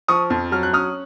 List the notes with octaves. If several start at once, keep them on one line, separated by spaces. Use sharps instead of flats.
F3 C#6 D#6
F2
F#3 F6
F#6
C#4 D#6 F6